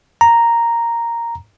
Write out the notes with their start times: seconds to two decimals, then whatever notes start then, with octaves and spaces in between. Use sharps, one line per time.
0.21 A#5